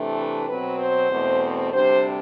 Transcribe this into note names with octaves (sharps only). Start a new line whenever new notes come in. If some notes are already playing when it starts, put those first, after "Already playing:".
Already playing: C3 E3 A3 D4
B4
B2 F#3 C4 B4
C5
E2 B2 A3 C4
D2 C3 G3 D4 C5